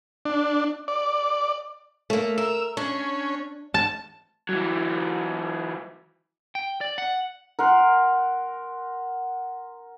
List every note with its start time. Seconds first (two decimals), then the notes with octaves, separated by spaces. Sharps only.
0.25 D4
0.88 D5
2.10 A3 A#3
2.38 A#4 E6
2.77 C#4 D4
3.74 A5
4.49 E3 F#3
6.55 G5
6.81 D5
6.98 F#5
7.59 A#4 F#5 C6